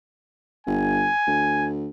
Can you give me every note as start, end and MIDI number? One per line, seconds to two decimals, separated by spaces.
0.67 1.09 31
0.67 1.69 80
1.27 1.88 38